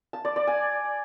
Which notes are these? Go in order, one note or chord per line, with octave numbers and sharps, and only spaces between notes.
A5
D5
D5
G#5